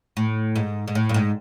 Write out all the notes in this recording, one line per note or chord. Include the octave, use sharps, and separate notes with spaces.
A2
G#2
G#2
A2
G2
G#2